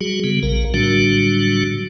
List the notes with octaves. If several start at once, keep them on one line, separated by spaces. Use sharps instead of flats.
F#3 G3 F#4 G#4
C#3 G3 B3
A#1 A#4
A2 D3 F#3 G3 D4 F#4